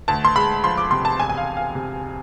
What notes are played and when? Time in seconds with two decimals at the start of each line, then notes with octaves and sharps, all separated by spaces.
0.08 D2 A5
0.25 C6
0.36 G#3 B5
0.64 F3 C6
0.78 D6
0.91 C3 C6
1.05 A5
1.19 E1 G#5
1.29 G#5
1.37 F5
1.47 E1
1.57 F5
1.75 C3